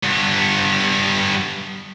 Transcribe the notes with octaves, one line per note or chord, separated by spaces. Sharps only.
G2 B3